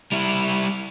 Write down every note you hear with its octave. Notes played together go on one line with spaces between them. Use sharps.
G3 E4